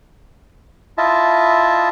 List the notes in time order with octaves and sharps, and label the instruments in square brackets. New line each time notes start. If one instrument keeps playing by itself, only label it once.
[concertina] E4 F4 D#5 E5 A5